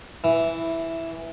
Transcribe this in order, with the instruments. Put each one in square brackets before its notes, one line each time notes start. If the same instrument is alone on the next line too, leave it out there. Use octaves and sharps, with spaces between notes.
[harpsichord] E3